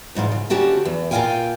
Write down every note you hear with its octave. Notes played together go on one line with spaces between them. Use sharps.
E2 G#2 B2 F4
C#3
D2 C#4 F#4 G4 A5
E2
A#2 F4 C#5 F5 G5 G#5